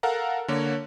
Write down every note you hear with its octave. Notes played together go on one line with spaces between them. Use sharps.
A4 A#4 F5 F#5 A#5
D3 A#3 C#5